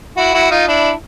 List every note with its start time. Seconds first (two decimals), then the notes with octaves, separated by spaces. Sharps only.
0.17 E4 F#4
0.34 E4 F#4
0.51 D#4 F4
0.68 D4 E4